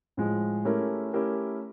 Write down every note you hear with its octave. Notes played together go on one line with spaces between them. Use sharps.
A2 F3 G#3
A3 C#4 E4 G4 A#4
A3 C#4 E4 G4 A#4